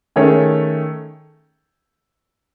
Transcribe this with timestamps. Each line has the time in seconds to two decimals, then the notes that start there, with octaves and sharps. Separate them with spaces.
0.16 D#3 A3 C#4 G#4 C#5